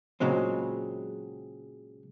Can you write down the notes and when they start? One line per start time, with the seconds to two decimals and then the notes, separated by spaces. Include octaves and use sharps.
0.20 A#2 C#3 F#3 G#3 C4